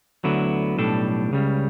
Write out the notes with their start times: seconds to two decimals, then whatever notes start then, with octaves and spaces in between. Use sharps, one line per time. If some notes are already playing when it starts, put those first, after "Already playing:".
0.24 D2 D3 F#3 B3 E4
0.77 B1 A2 G3 D4 A4
1.32 C#2 C#3 G3